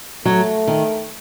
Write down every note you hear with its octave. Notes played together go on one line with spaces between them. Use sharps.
F#3 A3
D#3